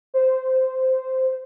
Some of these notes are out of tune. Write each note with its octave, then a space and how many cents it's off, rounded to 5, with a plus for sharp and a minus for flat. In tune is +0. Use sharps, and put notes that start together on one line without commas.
C5 -10